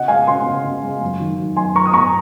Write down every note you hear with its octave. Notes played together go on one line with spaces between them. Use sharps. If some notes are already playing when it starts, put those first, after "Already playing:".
Already playing: C#3 D#5 F#5
G#3 F5 G#5
C#3 G#5 C6
C#3
C#3
G#3
F#2
D#3
F#2
F#2 G#5 C6
F#2 A#5 C#6
D#6
F#2 A#5 C#6